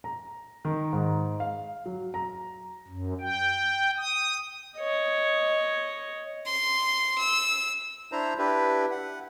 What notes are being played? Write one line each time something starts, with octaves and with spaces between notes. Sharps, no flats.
A#5
D#3
G#2
F5
F#3
A#5
F#2
G5
D#6
C#5 D#5
C6
E6
D4 E4 C5 A#5
D4 E4 G4 B4
F#5